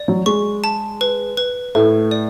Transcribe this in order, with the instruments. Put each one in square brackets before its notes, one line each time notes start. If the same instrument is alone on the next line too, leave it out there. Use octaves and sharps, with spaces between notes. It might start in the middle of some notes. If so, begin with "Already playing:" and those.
Already playing: [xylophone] D5
[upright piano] F#3
[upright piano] G#3 [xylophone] C#6
[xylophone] A5
B4
B4
[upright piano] A2 A3 [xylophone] B4
[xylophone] D5